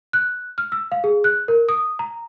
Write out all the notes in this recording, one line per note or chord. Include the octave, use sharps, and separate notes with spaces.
F#6
F6
E6
F5
G#4
F#6
A#4
D#6
A#5